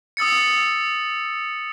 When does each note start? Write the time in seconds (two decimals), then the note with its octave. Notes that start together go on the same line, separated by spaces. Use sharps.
0.17 D#6 E6 A6 C#7